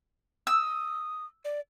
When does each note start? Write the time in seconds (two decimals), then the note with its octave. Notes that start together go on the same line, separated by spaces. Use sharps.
0.47 D#6 E6
1.45 D5